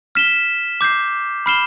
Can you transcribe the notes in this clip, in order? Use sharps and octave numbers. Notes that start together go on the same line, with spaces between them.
F6 B6 E7 G7
D6 G6 C7
B5 F6 C7 E7 G7